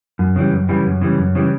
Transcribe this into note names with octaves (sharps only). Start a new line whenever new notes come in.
F#2
C#3 E3 G3
F#2
C#3 E3 G3
F#2
C#3 E3 G3
F#2
C#3 E3 G3